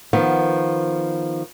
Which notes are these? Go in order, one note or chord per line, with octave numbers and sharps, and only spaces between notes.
D#3 F3 B3